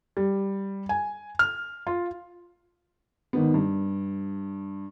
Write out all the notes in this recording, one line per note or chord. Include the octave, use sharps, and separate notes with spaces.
G3
G#5
F6
F4
G#1 D#3 B3
G2